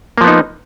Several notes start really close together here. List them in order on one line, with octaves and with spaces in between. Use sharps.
A#3 F3 B3 D#4